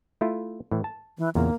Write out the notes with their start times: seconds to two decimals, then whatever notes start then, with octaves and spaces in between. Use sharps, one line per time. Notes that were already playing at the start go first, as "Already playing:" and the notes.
0.21 A3 E4 F4
0.71 A2 E3
0.84 A5
1.18 E3
1.35 E2 A#2 C#3 A#3